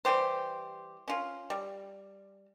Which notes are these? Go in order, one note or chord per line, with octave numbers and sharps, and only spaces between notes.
E3 G3 G4 C5
C#4 F4
G3